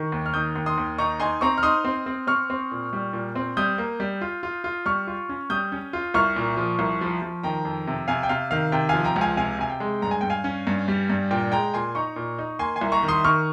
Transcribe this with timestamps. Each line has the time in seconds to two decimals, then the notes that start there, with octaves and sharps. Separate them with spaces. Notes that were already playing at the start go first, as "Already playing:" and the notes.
Already playing: D#3 C#6
0.12 D#2
0.26 F6
0.34 D#3 D#6 G6
0.56 D#2
0.66 C6 D#6
0.78 D#2
0.98 D#4 A#5 C#6
1.20 D#4 G#5 C6
1.41 C4 A#5 C#6
1.58 F6
1.63 D#4 C6 D#6
1.84 C4
2.06 C4
2.27 C4 C#6 F6
2.50 C4
2.71 A#2
2.93 G3
3.13 A#2
3.35 C4
3.57 G3 D#6 G6
3.78 A#3
4.00 G3
4.21 F4
4.43 F4
4.64 F4
4.86 G3 C#6 F6
5.07 F4
5.29 C#4
5.50 G3 D#6 G6
5.72 C#4
5.93 F4
6.14 C2 C#6 F6
6.36 A#2
6.57 F3
6.79 C2
7.01 F3
7.22 F3
7.43 D#3 G5 A#5
7.65 F2
7.87 C3
8.08 C3 F5 G#5
8.23 G5
8.29 C3 F5
8.51 D#3 F5
8.72 C3 G5
8.89 F3 F5 G#5
9.04 G5 A#5
9.16 C#2
9.21 F5 G#5
9.37 C3 F5 G#5
9.58 C3 G#5
9.70 G5
9.80 G#3
10.02 G2 A#5
10.11 G#5
10.21 G2 G5
10.30 F5 G#5
10.44 C#4
10.67 G2
10.88 G3
11.10 G2
11.31 A#2 G5
11.52 G#3 G5 A#5
11.74 A#2 G#5 C6
11.95 D#4 A#5 C#6
12.16 A#2
12.38 D#4
12.59 A#3 G#5 C6
12.76 G#5 C6
12.81 C2
12.92 A#5 C#6
13.03 D#3
13.08 C6 D#6
13.24 D#3 C#6 F6